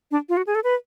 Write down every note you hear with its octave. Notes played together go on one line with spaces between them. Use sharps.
D4
F4
F#4
G#4
A4
B4